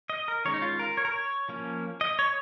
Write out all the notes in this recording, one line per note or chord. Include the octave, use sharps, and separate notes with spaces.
D#5
A#4
D#3 G#3 C#4 C#5
D#4
F4
A#4
C#5
A#4
C#5
F3 A#3 C#4
D#5
C#5